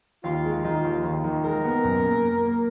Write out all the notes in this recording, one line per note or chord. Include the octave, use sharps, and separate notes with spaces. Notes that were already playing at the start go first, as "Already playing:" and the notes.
D#2 F4
G#3
D#3 F4
D#2
D#2
D#3
G#3 A#4
B3
F#2
A#3
A#3
A#3